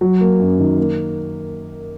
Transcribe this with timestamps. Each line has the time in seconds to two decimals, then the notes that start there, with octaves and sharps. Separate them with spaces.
0.01 F#3
0.20 A#3
0.39 F#2
0.59 D#3
0.78 A#3